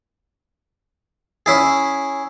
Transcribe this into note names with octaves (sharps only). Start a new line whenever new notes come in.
C#4 E4 G#4